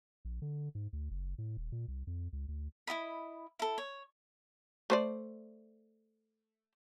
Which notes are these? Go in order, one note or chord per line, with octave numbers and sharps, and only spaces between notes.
A#1
D3
G#2
D2
F#1
A2
D#1
A#2
C2
F2
C#2
D2
E4 F#4 D#5 B5
E4 A4
C#5
A3 C5 D5